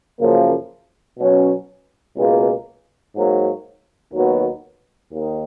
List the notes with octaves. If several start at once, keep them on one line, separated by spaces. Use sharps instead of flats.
F#2 C#3 F3 A#3
B2 F#3 C#4
C#2 B2 A#3 F4 G#4
G#2 F#3 A#3
D#2 D#3 F#3 B3 F#4
D#2 D#3